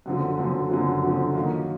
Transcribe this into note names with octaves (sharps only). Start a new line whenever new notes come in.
F#2 D3 F3
F#2 D3 F3
F#2 D3 F3
F#2 D3 F3
D#3 F#3 A#3